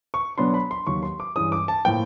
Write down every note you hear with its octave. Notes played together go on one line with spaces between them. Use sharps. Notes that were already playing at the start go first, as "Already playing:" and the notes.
C#6
B2 F#3 B3 D4 C6
B5
C6
D#2 D#3 F#3 C#6
C6
D6
G2 E3 G#3 C#4 D#6
D6
A5
A2 F3 A#3 G5